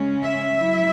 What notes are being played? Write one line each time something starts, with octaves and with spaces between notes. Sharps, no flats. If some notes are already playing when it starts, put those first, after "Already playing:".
Already playing: C#3 G#3 C#4
E5
F#3 E4